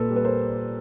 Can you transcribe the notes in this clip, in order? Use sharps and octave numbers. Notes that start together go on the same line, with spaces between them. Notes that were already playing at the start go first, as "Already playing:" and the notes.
Already playing: A#2 A4 B4
G3
B4
A#4 C5